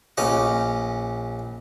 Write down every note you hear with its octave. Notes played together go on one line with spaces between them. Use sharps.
A#1 C#4 D#5 D6